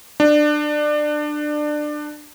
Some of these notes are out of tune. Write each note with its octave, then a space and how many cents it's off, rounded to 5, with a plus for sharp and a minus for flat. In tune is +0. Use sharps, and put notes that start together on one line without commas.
D4 +25